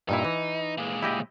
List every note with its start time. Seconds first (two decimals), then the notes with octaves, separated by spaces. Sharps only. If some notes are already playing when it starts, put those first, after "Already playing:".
0.09 G2 A#2 D#4 E4
0.25 E3
0.78 A#2 G#3
1.03 E4 G4 D#5